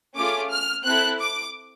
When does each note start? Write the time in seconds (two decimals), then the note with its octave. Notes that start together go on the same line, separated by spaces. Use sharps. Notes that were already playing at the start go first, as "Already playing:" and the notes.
0.16 A3 C#4 F4 G#4 D6
0.50 F6
0.85 C4 E4 A4 F#6
1.20 D6